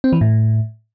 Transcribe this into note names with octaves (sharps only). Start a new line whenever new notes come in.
C4
E3
A2